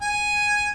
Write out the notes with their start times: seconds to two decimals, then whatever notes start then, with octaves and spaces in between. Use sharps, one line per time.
0.01 G#5